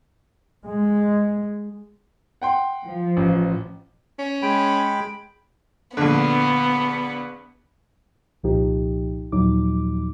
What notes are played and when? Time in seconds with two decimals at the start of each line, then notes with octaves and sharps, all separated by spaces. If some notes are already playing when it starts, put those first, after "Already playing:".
0.66 G#3
2.42 F#5 G5 C6
2.87 F3
3.17 A1
4.19 C#4
4.43 G#3 G5 B5
5.97 A#1 D3 B3
8.43 C2 A#2 F3 D#4 G4
9.32 D#2 A#2 F3 F#3 D#4 D6